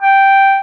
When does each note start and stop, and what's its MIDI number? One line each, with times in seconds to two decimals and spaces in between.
0.02 0.60 79